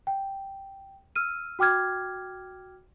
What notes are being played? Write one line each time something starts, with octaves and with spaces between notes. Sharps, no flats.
G5
E6 F6 D#7
F#4 G5 D6 F6 G#6